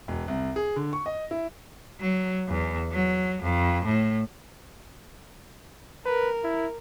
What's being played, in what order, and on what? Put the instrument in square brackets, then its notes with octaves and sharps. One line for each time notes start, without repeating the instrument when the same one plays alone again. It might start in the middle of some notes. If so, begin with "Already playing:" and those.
[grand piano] E1
C2
G#4
D3
C#6
D#5
E4
[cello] F#3
E2
F#3
F2
A2
[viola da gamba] A#4 [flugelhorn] B4
[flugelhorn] E4